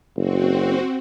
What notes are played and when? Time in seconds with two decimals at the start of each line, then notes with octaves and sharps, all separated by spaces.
0.17 F#1 C4 F#4